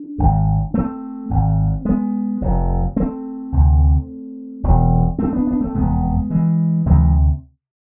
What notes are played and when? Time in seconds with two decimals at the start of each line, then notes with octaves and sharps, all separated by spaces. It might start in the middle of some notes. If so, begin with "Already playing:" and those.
Already playing: D4
0.18 G#1 G#2
0.74 A3 C4
1.30 G#1 G#2
1.85 G#3 B3
2.41 F1 F2 C3
2.96 A3 C4
3.52 D2 C3
4.63 E1 E2 B2
5.19 A3 C4
5.33 B3 D4
5.47 B3 D4
5.61 A3 C4
5.75 F1 E2 C3 G#3 B3
6.30 E3 G#3
6.86 D2 C3 E3 G#3